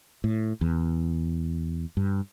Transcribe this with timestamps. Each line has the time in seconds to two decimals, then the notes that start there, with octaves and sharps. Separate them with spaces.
0.24 A2
0.61 E2
1.97 G2